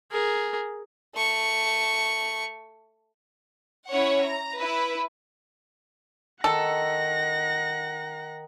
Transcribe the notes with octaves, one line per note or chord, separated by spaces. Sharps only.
G#4 A#4
A3 C#6
C#4 E4 C#5 F#5
A#5
E4 B4
D#3 A4 F#5 A#6